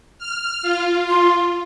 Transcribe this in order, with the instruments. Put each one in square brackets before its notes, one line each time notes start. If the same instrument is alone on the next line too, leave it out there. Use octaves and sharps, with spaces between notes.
[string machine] F6
F4
[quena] C6